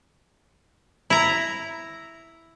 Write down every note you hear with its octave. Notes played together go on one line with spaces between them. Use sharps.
E4 A#5